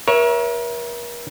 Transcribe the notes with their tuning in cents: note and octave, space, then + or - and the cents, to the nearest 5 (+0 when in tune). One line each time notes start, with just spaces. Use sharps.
A#4 +40 C#5 +0 E5 +0